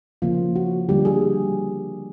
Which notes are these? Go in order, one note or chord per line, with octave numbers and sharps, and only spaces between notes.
C#3 F3 A#3 F4
F#4
D3 G3 A#3 G4
G#4